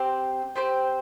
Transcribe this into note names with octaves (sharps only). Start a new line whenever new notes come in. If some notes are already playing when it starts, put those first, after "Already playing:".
Already playing: C4 G4 C5
C4 G4 C5